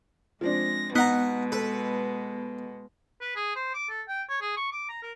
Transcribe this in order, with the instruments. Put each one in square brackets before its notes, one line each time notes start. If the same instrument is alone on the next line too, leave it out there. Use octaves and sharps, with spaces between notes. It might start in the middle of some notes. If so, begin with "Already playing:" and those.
[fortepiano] F3 C4 D4 [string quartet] G#3 A#6
[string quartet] B2 G#3 [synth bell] B3 [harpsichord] D#4 F#5 A#5
[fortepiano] A4 [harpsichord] B4
[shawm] B4
G#4
C5
D6
A4
G5
C#5
G#4
C#6
D6
A#5
A#4